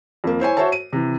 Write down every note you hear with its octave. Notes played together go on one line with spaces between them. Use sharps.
F2 A#3
E4 C5 C#5 G#5
F#4 C5 C#5 E5 A5
D#7
C3 E3